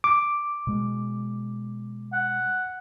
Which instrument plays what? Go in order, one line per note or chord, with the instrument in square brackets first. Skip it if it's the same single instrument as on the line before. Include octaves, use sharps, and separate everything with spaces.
[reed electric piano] D6
[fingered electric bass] B2 G#3
[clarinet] F#5